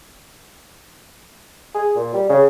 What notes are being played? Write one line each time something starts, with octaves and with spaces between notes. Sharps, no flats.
G#4
A#2
G3
C#3